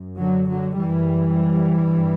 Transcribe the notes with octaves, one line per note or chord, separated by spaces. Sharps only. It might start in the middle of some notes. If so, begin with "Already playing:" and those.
Already playing: F#2
D3 F#3
D3 F#3
F#2 E3 G3
G2